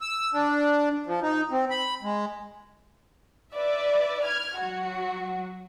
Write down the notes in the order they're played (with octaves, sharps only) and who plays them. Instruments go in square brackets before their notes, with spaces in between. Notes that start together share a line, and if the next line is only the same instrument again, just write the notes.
[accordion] E6
D4
F3
D#4
C4
B5
G#3
[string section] B4 D5 E5
F6 G#6
F#3 F#4